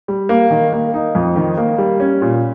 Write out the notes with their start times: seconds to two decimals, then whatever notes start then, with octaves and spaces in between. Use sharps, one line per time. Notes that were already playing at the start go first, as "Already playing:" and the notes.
0.08 G3
0.29 A#3
0.50 D#3
0.73 A#3
0.94 D#4
1.15 F2
1.36 D#3
1.57 A#3
1.78 G3
2.00 C#4
2.22 A#2